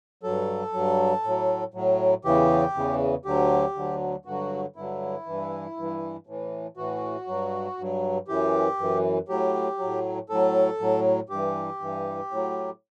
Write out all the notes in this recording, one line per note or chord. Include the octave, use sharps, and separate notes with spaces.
G2 F#3 A4
G2 F#3
A2 F#3
A2 F#3
E2 C#3 E3 G4
E2 C#3 E3
D2 D3 F#3 G4
D2 D3 F#3
G2 D3 F#3 F#4
G2 D3 F#3 E4
G2 E3
G2 E3
A2 E3
A2 E3 F#4
G2 F#3
G2 F#3
F#2 E3 G4
F#2 E3
A2 F#3 G4
A2 F#3
A2 F#3 A4
A2 F#3
G2 E3 G4
G2 E3
A2 F#3